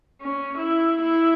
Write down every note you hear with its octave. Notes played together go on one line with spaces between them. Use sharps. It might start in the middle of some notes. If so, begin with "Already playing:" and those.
C#4
E4
E4